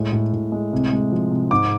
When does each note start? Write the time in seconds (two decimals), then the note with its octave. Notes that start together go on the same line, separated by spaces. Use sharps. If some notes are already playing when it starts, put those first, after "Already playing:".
Already playing: A2 G#3
0.13 A2
0.33 A2
0.52 G#3
0.73 C3
0.93 G#3
1.12 F3
1.31 C3
1.51 G#2 D6